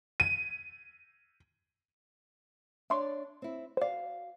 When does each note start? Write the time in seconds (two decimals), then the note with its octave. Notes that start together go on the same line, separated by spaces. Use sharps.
0.20 D#7
2.90 D4 C#5 D5 E5 C6 C#6
3.42 C4 E4
3.77 F#4 C5 D5 F5